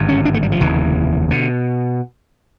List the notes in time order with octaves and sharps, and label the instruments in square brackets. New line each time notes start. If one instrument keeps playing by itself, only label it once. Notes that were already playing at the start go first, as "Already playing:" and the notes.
Already playing: [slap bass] G#1 G2 D3
C#4
D4
A3
G3
F3
F1 D#2 C#3 E3
B2 D3